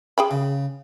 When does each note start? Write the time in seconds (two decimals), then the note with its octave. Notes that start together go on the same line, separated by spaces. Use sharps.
0.18 G#4 G5 B5
0.31 C#3